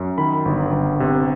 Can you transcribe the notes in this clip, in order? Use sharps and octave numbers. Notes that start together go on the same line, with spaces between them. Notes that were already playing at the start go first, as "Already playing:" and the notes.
Already playing: F#2
D#3 B5
G1
G1
C3